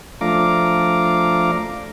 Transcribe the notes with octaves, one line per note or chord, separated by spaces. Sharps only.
F3 A3 D4 F5 A#5 D6